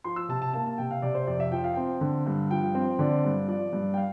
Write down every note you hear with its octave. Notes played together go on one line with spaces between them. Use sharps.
F3 C6
E6
C3 A5
A5
A#3 A5
A5
C3 G5
F5
C3 D5
C5
F2 D5
E5
F3 G5
F5
C4 G5
D3
G2
F3 G5
C4
D3 D5
G2
F3 D5
G2
G5
F5